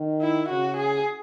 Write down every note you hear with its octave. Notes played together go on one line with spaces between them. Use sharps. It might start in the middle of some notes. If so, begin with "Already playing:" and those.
Already playing: D#3
E4
C#3 F#4
G#4